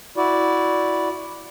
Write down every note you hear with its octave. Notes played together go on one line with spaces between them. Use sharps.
E4 F#4 D5